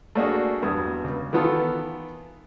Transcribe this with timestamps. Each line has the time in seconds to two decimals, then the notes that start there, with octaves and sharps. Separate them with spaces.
0.15 A3 A#3 D4 F#4 G#4
0.62 E2 G2 F#3 D#6
1.04 C#2
1.33 D#3 E3 B3 F4 A4